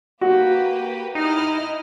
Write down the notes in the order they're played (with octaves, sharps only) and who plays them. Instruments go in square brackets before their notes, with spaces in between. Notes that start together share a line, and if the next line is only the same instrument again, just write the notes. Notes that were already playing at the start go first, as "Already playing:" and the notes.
[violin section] A#3 G4 B4 [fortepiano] F#4
[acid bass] D#4 [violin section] E4 D#5 F6